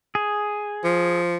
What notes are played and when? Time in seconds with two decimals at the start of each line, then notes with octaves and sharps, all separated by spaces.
0.15 G#4
0.84 F3